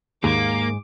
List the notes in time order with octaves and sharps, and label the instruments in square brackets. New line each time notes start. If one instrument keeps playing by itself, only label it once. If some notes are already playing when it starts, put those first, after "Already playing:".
[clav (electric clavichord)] D#2 [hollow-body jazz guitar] G#2 G#4 [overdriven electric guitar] A#3 [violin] D6